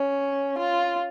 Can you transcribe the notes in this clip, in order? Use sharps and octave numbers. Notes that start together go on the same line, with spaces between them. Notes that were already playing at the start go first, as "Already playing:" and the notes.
Already playing: C#4
F4